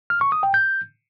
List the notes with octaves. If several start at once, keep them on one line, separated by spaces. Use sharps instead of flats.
F6
C#6
D#6
G5
G6